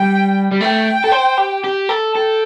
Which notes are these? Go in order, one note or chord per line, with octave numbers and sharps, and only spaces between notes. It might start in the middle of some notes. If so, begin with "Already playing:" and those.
Already playing: G3 G5
G3
A3 G5
A4
C5
G4
G4
A4
A4 G5